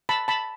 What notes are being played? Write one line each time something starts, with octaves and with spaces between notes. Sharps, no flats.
A5 B5
A5 B5